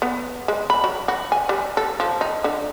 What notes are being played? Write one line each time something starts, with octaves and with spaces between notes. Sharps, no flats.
B3
G#3
B5
F#3
F#4
G#5
G3
A4
F3
D#4
D3